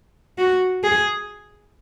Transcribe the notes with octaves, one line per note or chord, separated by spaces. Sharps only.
F#4
G#4